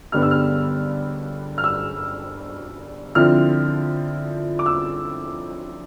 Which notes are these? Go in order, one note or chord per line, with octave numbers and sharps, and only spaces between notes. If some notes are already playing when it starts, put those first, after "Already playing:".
G2 D3 G3 B3 F6
E6
F6
F6
E6
D3 F3 C4 E4 F6
D6
E6